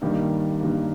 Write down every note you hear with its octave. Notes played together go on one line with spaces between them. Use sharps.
G2 D#3 G3 A#3
G2 D#3 G3 A#3